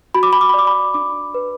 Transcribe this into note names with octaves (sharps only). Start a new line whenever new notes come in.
F#4 B5
D6
B5
D6
B5
D5 D6
B5
D4 D6
B4